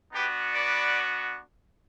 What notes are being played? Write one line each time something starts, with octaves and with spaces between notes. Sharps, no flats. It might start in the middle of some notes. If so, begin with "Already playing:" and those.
B3 D4 F#4 G4 B4
B4 D5